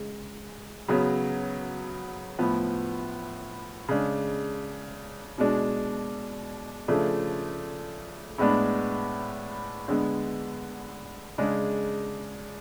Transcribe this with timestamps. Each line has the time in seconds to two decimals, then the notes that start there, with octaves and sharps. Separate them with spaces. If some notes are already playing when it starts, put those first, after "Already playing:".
Already playing: C#3 G#3
0.88 C#3 F#3 B3
2.39 A2 F3 B3
3.88 C#3 G#3 D4
5.38 B2 G#3 D4
6.88 C#3 F3 A3 D4
8.38 A2 G#3 B3 D4
9.88 D3 G#3 B3
11.38 C#3 G#3 D4